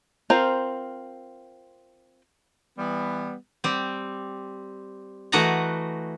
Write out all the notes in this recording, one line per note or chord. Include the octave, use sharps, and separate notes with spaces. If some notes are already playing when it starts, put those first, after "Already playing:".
C4 F4 A#4 C5
E3 G3 B3
G3 C4
E3 A3 F#4 D#5 F#5 A#5